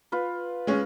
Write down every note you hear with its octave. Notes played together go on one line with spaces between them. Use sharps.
F4 B4
G#3 C#4